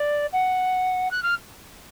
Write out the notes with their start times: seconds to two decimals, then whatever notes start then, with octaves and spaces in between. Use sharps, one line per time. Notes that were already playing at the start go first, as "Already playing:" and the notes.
Already playing: D5
0.33 F#5
1.11 F#6
1.23 F6